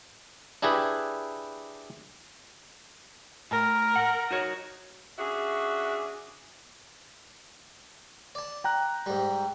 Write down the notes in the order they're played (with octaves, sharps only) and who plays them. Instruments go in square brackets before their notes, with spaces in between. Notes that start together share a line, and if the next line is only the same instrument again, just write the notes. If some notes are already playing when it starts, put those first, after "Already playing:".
[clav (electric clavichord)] D4 E4 G4 G#4 B4
[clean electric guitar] A2 [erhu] A#4
[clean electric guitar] F#5
D#4 F#4 C#5
[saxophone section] C#4 D4 F#4 G#4 E5
[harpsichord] D5 A5
[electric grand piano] G5 A#5 F#6
[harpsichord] G#2 G3